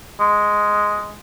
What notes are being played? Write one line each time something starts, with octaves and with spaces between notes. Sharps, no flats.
G#3